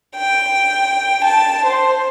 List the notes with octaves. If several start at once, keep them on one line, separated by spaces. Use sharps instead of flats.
G5
A5
C5